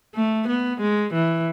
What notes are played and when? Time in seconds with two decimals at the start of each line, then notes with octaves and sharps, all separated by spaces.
0.15 A3
0.48 B3
0.80 G#3
1.13 E3